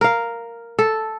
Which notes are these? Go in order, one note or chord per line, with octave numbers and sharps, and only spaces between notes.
A#4 F5
A4